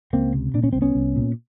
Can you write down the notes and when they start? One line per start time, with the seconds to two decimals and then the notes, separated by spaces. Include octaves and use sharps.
0.13 C#2 A#3 C4
0.34 C3
0.54 A#2 D4
0.64 C#4
0.73 C2 C4
0.82 B3 C#4
0.95 C2
1.16 A#2